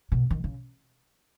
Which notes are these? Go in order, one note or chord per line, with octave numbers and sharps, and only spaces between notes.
B2
D#3
C#3